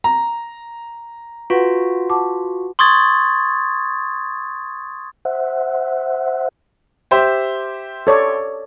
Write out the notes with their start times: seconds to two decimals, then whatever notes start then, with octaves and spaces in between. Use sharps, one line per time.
0.04 A#5
1.50 F4 F#4 B4 F#5
2.10 F#5 A5 D6
2.79 C6 C#6 D#6 G#6 A6
5.25 C5 E5 F#5
7.11 G4 C5 E5
8.07 A4 C#5 D5